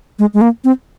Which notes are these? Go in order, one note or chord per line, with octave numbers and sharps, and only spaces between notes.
G#3
G#3
A#3
C4